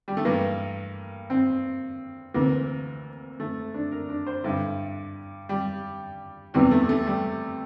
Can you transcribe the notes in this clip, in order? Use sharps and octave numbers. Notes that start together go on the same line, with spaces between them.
G3
A3
G2 E3 A#3
C4
D2 C3 E3 A#3
A3
D4
A#4
D4
C5
G2 D3 E4
G3
E2 C3 E3 G3
A3
A3
G3